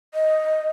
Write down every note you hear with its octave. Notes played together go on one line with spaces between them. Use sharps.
D#5